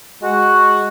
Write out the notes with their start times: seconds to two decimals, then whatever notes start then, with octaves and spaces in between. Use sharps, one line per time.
0.22 G#3 F#4